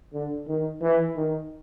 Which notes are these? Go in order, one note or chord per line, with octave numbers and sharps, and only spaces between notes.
D3
D#3
E3
D#3